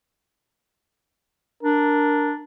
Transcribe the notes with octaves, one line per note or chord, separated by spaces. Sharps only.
D4 A#4